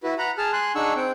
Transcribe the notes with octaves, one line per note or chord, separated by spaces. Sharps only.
E4 F#4 B4
F#5 A#5 B5
G#4 A5 F6
G#5 C6 F#6
D4 D#4 G#4 F#5 C#6 E6
C4 G5